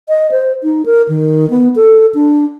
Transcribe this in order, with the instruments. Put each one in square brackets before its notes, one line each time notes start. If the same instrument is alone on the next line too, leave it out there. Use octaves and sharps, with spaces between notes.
[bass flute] D#5
C5
D#4
A#4
D#3
B3
A4
D4